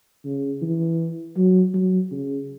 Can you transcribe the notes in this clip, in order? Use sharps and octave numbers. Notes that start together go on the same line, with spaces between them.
C#3
E3
F#3
F#3
C#3